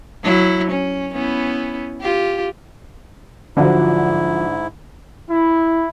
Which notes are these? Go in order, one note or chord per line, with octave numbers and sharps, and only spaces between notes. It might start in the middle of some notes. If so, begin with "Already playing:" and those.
F#3 E4
C#4
B3 C#4 E4
F4 G4
G#2 D3 F3 F#3 E4
E4